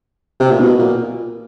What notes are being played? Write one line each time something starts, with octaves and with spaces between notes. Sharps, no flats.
C3
A#2
B2
A#2